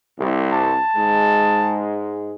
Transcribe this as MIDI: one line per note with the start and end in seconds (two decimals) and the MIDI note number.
0.19 0.74 36
0.52 1.82 81
0.95 2.35 44
0.95 2.35 56